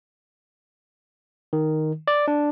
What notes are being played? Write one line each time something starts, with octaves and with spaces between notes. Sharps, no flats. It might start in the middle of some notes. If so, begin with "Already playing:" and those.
D#3
D5
D4